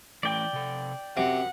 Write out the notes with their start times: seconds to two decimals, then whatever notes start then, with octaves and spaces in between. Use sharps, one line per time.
0.23 E3 A3 D5 G5
0.53 C3 A4
1.17 C3 F#4 A#4 F#5 D6